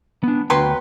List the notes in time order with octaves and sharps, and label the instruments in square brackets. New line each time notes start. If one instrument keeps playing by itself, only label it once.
[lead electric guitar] B3 D4
[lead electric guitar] D2 G5 [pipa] F#3 B4 C6